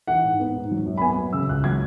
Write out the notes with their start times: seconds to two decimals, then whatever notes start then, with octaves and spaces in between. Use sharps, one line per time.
0.07 E3 F#5
0.24 G#2
0.40 B3
0.55 G#2
0.71 F#3
0.86 F#2
0.98 B5
1.01 B3 G#5
1.17 F#2
1.33 C#3 E6
1.49 C#2 F#6
1.64 F#3 G#6